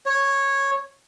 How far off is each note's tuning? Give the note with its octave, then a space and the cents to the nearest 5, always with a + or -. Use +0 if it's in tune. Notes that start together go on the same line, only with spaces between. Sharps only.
C#5 -10